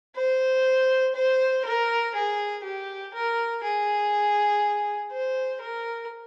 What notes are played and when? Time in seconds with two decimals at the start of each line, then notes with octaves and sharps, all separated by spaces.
0.16 C5
1.15 C5
1.65 A#4
2.15 G#4
2.64 G4
3.14 A#4
3.63 G#4
5.12 C5
5.62 A#4